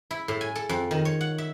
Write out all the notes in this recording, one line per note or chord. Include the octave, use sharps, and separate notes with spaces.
E4
A2
G#5
A4
F2
D#3
C#5
F#5
E5